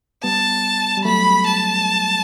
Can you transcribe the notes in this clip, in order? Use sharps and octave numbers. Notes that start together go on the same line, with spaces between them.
G3 B3 A5
G3
F#3 A3 B5
A5